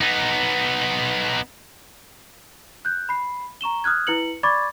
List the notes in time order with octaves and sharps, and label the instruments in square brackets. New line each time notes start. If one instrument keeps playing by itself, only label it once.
[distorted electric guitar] B3 D#4
[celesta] F#6 G6
B5 C7
A#5 C#6 E7 G7
D#6 F6 F#6 G#6
E4 B4 C#7 F#7
D5 B5 C#6 D6 G#6 A6